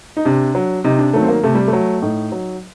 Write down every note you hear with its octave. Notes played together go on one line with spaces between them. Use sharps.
D#4
C3 D4
F#3
C3 D#4
D4
D#3 F#3 A3
C4
A#3
C3 A3
G3
A3
F#3
A2 D#4
F#3